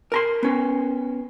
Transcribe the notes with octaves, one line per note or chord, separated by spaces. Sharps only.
A#4 A#5 C6
B3 C#4